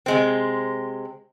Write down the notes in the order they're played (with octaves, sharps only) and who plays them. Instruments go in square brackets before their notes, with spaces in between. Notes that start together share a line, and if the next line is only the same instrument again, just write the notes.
[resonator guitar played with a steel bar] C3 G#3 C4